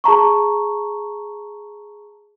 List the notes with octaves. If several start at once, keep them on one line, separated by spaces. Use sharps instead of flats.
G#4 A5 A#5 C#6